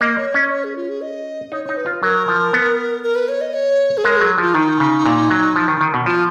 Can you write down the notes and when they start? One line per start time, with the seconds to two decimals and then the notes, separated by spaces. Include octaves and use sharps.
0.01 A#3 D#5
0.18 C#5
0.34 C#4 D#5
0.51 C#5
0.64 G#4
0.76 F4
0.89 G#4
1.01 D#5
1.52 D#4 C#5
1.65 D#4 C#5
1.77 B4
1.86 F4
2.03 F#3 A#4
2.28 F3
2.53 B3
3.03 A#4
3.16 B4
3.28 C#5
3.41 D#5
3.54 C#5
3.98 G#4
4.04 G#3 A#4
4.17 F#3 G#4
4.38 F3 F4
4.54 D#3 D#4
4.80 C#3
5.06 A#2
5.30 F#3
5.56 F3
5.68 D#3
5.81 D#3
5.94 B2
6.06 F3 F4